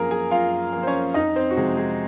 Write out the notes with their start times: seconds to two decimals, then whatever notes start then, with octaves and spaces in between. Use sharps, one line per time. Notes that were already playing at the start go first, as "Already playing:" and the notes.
Already playing: F#2 F3 A#3 G#4 A#4 G#5 A#5
0.11 G#4 G#5
0.31 F#2 F4 F5
0.73 F3 A#3
0.83 C5
0.87 C#4 C#5
1.14 F2 D#4 D#5
1.36 C4 C5
1.51 F#4
1.57 C3 F3 G#3 G#4
1.77 G#3 G#4